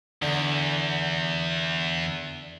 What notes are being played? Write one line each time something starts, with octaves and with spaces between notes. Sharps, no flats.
E2 D3